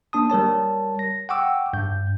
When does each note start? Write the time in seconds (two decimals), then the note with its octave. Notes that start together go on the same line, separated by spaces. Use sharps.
0.13 A#3 D4 A5 D#6
0.30 G3 A#4 C#5 A5
0.99 A#6
1.29 F#5 G5 C#6 D6 E6
1.73 G2 G6